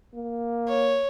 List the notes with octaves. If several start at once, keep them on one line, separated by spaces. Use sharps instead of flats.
A#3
C#5